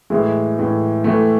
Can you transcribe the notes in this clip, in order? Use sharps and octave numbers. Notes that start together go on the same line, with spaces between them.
A2 E3 G#3
A2 E3
A2 E3 A3